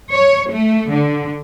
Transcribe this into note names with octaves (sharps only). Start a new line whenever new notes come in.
C#5
A3
D3